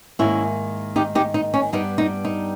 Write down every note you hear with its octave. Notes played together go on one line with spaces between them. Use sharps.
G#2 D#3 A#3 C#4 E4
D#4 G4
D#4 G4
D#4
C#4
G2 G3 B3 D#4
D#4
D#4